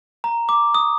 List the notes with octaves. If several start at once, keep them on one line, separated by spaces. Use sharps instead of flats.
A#5
D6
D#6